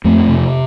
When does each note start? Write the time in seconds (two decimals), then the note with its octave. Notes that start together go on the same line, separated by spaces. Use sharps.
0.05 F2 A3 C4
0.28 C3